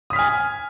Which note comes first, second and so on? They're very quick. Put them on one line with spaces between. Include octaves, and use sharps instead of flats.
D#6 B6 F6 G#5